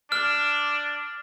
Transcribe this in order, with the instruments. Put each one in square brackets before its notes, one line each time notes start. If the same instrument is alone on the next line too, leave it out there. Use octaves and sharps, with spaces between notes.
[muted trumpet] D4 [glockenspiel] F6